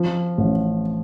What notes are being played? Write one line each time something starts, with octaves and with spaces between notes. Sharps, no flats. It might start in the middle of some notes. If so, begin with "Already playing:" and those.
Already playing: F3
A1